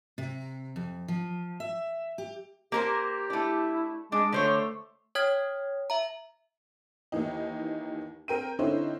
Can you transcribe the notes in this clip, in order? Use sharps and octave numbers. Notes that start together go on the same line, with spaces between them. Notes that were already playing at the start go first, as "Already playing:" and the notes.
C3
F2
F3
E5
G4
A#3 G4 A#4 C5
A3 D4 E4
G#3 D4 D6
D3 A3 C5 C#5
C#5 G5 D#6 F6 G#6 B6
E5 A#5
D#2 D#3 E3 D#4
C4 A#4 G5 D#7
D3 C4 C#4 D#4 E4 C5